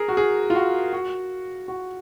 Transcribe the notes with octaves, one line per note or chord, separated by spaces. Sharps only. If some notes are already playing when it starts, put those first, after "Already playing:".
Already playing: G#4 A#4
F#4
G#4
F4
F#4
F#4
F#4